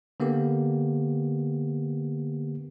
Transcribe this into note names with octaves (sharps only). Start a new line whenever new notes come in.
D3 A#3 B3 G4